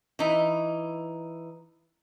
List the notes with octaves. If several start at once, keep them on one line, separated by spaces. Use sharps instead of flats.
E3 D#4